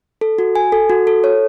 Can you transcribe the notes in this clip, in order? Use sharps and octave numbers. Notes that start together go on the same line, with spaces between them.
A4
F#4
G#5
A4
F#4
A4
C#5